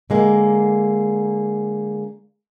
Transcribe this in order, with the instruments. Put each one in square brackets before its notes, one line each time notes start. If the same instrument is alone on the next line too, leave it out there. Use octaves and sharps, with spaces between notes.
[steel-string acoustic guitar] D3 G#3 A#3